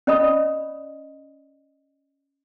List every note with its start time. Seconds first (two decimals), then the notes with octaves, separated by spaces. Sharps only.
0.07 C#4 D5 D#5 B5 D#6